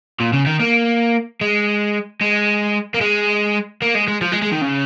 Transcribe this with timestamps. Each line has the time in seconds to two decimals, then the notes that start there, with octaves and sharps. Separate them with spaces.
0.20 A#2
0.33 C#3
0.46 D#3
0.60 A#3
1.41 G#3
2.21 G#3
2.94 A#3
3.01 G#3
3.82 A#3
3.95 G#3
4.08 G#3
4.22 F3
4.32 G#3
4.42 G#3
4.52 D#3
4.62 C#3